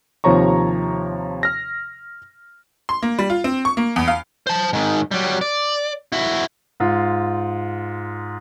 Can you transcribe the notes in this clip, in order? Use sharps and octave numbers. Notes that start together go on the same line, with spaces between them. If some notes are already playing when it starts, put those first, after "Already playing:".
D#2 C3 F3 C#5 A#5 C#6
F6 A#6
C6
A#3
G3
F4
C4
C#6
A#3
E2
F5
C5 A5
G#2 D#3
F#3 G3
D5
E4 F#4
G#2 F4